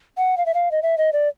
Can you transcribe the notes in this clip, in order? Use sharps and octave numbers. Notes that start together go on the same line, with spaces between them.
F#5
F5
E5
F5
D#5
E5
D#5
D5